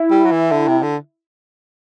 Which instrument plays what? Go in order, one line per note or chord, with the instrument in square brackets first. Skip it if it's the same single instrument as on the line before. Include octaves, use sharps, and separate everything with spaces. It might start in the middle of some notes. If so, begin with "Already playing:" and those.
Already playing: [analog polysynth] E4
[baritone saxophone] G3
F#3
E3
D3
C3
D3